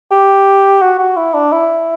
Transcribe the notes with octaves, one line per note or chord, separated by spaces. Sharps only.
G4
F#4
F#4
E4
D4
E4